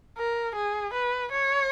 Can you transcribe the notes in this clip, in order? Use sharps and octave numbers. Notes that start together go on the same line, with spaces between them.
A#4
G#4
B4
C#5